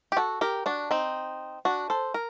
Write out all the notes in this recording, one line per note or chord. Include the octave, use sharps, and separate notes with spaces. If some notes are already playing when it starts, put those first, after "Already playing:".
G4
F#4 A4
G4 A#4
D4 F#4
C4 D#4
D4 F#4
A4 C5
A#4